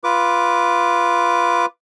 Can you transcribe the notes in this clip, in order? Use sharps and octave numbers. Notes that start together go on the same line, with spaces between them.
F4 B4 D6